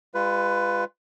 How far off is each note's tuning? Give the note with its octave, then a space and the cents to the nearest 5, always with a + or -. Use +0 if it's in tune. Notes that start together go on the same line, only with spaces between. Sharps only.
G#3 -45 F4 +0 B4 +15